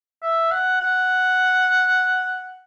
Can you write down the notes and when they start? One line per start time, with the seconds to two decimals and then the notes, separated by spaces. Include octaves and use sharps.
0.23 E5
0.51 F#5
0.81 F#5